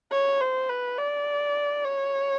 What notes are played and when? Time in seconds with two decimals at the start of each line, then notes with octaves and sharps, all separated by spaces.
0.12 C#5
0.41 C5
0.70 B4
0.98 D5
1.85 C#5